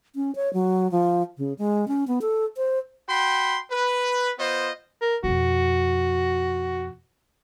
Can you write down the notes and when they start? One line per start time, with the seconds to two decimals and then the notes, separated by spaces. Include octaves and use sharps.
0.15 C#4
0.35 C#5
0.53 F#3
0.91 F3
1.38 C#3
1.59 G#3
1.88 C#4
2.08 B3
2.21 A4
2.57 C5
3.09 F#4 G5 B5 C6
3.71 B4
4.39 B3 F4 C5 D#5
5.01 A#4
5.24 F2 B2 F#4